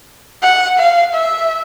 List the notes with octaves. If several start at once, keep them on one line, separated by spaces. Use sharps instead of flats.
F#5
F5
E5